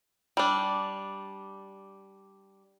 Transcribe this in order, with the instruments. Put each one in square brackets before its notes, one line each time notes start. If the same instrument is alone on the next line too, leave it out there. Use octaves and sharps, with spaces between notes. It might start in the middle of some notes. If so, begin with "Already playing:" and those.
[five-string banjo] G3 D4